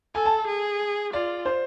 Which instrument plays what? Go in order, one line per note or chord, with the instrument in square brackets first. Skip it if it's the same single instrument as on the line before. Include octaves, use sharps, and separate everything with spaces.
[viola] A4 [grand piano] G#5
[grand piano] A5
[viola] G#4
[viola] F4 [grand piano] D5
[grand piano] C5